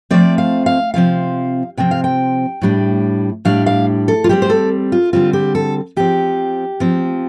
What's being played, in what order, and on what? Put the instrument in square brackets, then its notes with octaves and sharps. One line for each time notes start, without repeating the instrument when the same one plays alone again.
[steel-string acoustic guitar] F3 A3 C4 D5
F5
F5
C3 F3 C4 F5
C3 F3 C4 G5
F5
G5
A2 G3 D4
A2 G3 D4 F5
F5
A4
F4
D3 G3 C4 G4
C5
A4
F4
D3 G3 C4 F4
G4
A4
F3 C4 G4
F3 C4